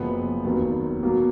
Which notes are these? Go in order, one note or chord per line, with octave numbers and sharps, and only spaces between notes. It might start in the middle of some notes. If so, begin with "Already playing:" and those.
Already playing: F#1 F#2 F3 B3
F1 D#2 D#3 F#3 B3
B2 F#3 A#3